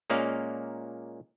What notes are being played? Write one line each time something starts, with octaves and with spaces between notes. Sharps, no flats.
A#2 G#3 A#3 C#4 D5 F5